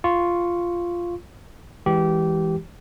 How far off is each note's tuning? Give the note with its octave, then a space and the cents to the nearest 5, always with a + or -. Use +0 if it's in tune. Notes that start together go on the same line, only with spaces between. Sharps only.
F4 -5 C#6 +0
E3 +0 G#3 +0 G4 -20